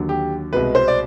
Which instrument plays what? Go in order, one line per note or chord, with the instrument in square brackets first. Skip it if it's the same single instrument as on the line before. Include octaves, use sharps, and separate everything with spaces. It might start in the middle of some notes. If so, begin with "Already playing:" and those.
Already playing: [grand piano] D#2 D3 F#3
G4
C2 B2 G#3 B4
C5
D5